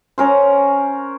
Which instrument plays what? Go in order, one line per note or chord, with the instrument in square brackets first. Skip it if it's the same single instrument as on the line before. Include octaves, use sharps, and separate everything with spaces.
[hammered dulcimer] C#4 A#4 C5